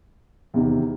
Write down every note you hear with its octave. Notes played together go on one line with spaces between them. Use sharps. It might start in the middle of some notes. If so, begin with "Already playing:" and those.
E2 C3 D#3